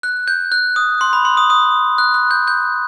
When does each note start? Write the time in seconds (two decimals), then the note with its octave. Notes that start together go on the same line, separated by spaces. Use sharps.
0.03 F#6
0.28 G6
0.52 F#6
0.76 D#6
1.01 C6
1.13 B5
1.25 C6
1.37 D#6
1.50 D#6
1.98 F#6
2.14 F#6
2.31 G6
2.48 G6